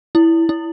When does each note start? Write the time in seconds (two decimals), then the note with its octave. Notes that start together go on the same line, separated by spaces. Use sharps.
0.15 E4
0.49 E4